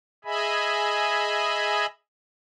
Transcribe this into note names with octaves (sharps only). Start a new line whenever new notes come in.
G#4 D#5 E5 G#5 B5